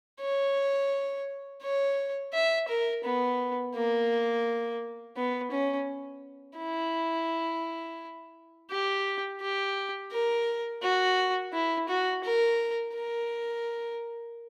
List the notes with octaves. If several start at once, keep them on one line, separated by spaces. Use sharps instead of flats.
C#5
C#5
E5
A#4
B3
A#3
B3
C#4
E4
G4
G4
A#4
F#4
E4
F#4
A#4
A#4